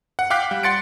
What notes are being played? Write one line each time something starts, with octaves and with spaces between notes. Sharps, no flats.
F#5
F5 G5 D6 F#6 B6
G3
F#5 C6 A6 C#7 D7